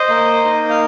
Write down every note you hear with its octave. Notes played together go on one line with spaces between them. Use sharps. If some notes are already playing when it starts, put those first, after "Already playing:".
Already playing: C5 D#5
A#3
D#4
F5